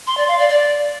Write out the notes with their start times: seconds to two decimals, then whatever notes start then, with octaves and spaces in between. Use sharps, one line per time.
0.07 C6
0.17 D5
0.28 F5
0.38 D5
0.49 D5